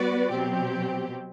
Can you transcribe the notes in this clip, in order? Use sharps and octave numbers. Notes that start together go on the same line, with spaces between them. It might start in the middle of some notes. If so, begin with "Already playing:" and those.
Already playing: G3 B3 F#4 B4 D5
B2 F#3 C4 G4